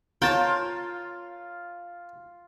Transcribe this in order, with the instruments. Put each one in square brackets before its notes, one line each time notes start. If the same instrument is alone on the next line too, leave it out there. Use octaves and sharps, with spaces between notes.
[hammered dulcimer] F4 [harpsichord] A#4 C#5 [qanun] G5 A5